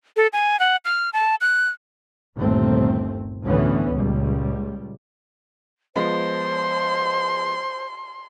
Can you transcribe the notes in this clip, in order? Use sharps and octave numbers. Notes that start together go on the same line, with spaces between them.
A4
G#5
F#5
F6
A5
F#6
G1 D#2 A#2 A3 C4
D2 A2 E3 B3 C#4
C#2 A#2 G3
F3 G#3 B3 C5 C6